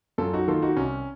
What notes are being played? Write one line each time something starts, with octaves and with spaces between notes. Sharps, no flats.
F#2 F4 A4
D#4 F#4
D#3 A#3 F4 A4
D#4 F#4
C2 C#4